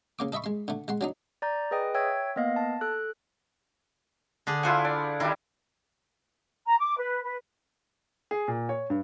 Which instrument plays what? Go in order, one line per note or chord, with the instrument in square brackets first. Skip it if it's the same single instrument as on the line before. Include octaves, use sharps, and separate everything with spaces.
[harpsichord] C#3 A#3 D6
A4 D#5 E5 B5 C#6
G#3 C6
D3 A3
G#3 F#5 C6
F#3 D4 D#4
[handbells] D5 A#5 G6
G#4 B4 D#5 G5 D#6
C#5 E5 G5 E6 G#6
A#3 B3 D#5 F5
A5
A4 F#6
[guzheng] D3 D4 G#4
[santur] E4 F4 F#5 [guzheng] C5 G#5
[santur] D4 D5
[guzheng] D#3 [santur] G3 D4 E4
[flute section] A#5
D6
B4
B4
[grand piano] G#4
A#2
C#5
G2